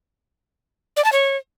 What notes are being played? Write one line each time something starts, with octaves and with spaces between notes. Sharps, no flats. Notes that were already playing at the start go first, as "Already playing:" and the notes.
D5
A5
C#5